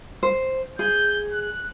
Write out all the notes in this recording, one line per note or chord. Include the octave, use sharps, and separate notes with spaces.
C5
G#4 G6
F#6